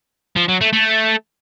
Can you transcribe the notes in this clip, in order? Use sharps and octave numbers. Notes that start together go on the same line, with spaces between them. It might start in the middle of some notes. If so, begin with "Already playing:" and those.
F3
F#3
A3
A3